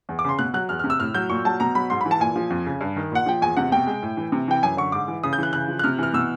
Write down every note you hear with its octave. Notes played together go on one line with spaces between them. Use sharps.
E2
D6
C#3 C6
B2 F#6
F#3 F#6
E2 F6
F6
C3
E6
A2 F6
F#3 G6
A#2 C#6
F#3 A5
B2 A#5
F#3 B5
G#2 C6
B5
E3
A5
A#2 G#5
F3
F2
C#3
G2
D#3
A#2 F#5
F3 G5
E2 G#5
C3 F#5
B2 G5
G#3
A2
E3
C3
E3 G5
F#2 G#5
D3 C#6
G#2 D6
E3
C#3 D#6
G6
E3 F#6
C#3 F#6
F3
F#6
C3 F6
E3 F6
B2 E6